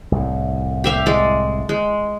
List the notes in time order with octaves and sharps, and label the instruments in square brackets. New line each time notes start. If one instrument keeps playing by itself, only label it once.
[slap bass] C2 A2
[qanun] G4 E5 F5
G#3 D5
G#3